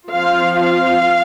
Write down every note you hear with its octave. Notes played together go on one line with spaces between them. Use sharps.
F3 C4 F4 F5
F5